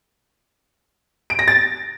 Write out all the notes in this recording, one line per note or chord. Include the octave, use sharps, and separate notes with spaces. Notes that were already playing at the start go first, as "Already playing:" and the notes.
D7
A#6
A6